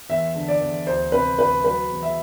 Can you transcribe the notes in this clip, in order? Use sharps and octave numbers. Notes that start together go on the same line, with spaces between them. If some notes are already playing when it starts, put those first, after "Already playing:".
E2 E5
D3
D5
E2
D2 C5
C3 B4
D2 B4
F#3 B4
E2
E5